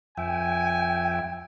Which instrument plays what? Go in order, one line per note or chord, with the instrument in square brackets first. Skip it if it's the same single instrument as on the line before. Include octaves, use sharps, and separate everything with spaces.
[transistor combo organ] F2 E5 [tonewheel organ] G5 [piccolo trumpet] G#5